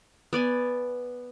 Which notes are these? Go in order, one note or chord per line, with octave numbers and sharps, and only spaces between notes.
B3 D5 G#5